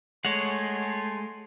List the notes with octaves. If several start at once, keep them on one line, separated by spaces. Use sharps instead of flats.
G#3 A3 C#5 F#5 G#5 C6